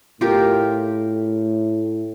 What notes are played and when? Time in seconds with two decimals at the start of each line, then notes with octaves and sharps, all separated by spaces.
0.21 A2 F4 G4 A#4